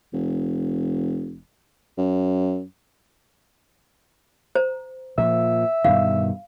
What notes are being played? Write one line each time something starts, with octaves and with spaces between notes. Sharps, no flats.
F1
F#2
C5 A#5
A#2 F3 E5
G2 B2 D#3 F5